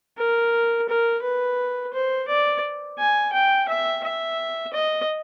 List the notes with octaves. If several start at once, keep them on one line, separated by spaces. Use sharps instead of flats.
A#4
A#4
B4
C5
D5
G#5
G5
E5
E5
D#5